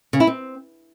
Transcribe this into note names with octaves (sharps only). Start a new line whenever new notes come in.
C#3
E4
C4